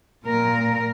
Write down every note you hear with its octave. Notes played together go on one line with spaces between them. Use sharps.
A#2 A#4